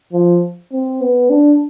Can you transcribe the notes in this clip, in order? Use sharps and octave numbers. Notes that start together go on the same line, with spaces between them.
F3
C4
B3
D4